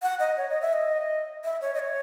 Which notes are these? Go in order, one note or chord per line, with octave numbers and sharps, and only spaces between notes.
F#5
D#5
C#5
D#5
E5
D#5
E5
C#5
D#5
C#5